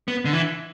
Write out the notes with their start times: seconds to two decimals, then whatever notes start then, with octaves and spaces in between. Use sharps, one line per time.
0.08 B3
0.25 D3
0.33 E3